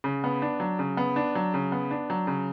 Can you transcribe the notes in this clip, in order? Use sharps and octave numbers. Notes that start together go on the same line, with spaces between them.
C#3
B3
D4
F#3
C#3
B3
D4
F#3
C#3
B3
D4
F#3
C#3